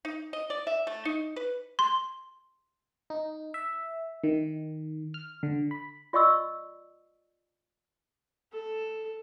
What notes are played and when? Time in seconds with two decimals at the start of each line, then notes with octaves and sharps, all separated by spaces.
0.05 D#4
0.33 D#5
0.50 D5
0.67 E5
0.87 A3
1.05 D#4
1.36 B4
1.79 C6
3.10 D#4
3.54 E5
4.24 D#3
5.14 F6
5.43 D3
5.71 B5
6.13 F4 D5 D#5 C#6 E6
8.53 A4